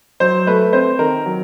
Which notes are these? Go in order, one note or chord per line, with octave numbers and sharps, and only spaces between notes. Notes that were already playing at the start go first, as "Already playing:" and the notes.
F#3 C5
A3 B4
C4 C5
D#3 A#4
F#3